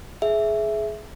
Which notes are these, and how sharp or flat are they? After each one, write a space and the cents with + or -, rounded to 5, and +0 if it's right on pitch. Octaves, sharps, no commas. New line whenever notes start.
G#4 +25 E5 +0